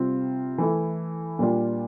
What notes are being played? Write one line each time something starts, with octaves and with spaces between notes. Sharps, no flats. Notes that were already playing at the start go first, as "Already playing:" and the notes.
Already playing: C3 G3 C4 F4
E3 A3 E4
A#2 G3 A#3 D4 F4